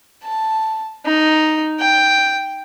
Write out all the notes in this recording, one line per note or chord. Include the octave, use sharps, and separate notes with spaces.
A5
D#4
G5